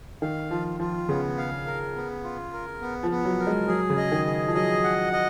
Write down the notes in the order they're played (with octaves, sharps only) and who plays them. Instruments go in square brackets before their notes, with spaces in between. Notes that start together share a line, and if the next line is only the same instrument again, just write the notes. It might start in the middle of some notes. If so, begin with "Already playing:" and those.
[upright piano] D#3 [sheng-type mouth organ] F5
[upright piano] F3 [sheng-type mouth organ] F4
[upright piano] F3 [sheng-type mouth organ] F4
[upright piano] C#3 [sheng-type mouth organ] B3
[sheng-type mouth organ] F5
A#4
B3
F4
A#4
B3
[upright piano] F3
[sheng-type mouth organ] B3
[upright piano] F#3
[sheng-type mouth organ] A#4
[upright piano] G#3
[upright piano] F#3 [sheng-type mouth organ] G#4
[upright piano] C#3
[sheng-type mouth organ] D#5
[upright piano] D#3
[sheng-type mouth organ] G#4
[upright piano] F3
[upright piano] F#3 [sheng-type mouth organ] D#5
[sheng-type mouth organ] F#5
D#5